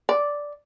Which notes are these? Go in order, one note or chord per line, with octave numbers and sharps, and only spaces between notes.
D5